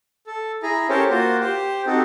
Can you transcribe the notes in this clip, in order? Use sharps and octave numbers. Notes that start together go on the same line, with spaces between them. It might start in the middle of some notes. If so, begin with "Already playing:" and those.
A4
E4 G#4 A#5
C#4 G4 A4 A#4 C5 C#5
A#3 F4 F#4 C5
G4 C5
C4 D#4 F#4 G4 A4